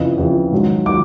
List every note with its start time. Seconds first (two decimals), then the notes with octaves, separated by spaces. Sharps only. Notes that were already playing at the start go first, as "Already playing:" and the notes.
Already playing: F2 C#3 E3
0.18 F2 C#3 E3
0.52 G#2 D#3 F#3
0.86 D#3 F#3 D6